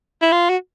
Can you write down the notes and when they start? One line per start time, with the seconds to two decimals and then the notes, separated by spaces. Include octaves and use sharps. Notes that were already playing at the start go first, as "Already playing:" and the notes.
0.22 E4
0.32 F4
0.49 F#4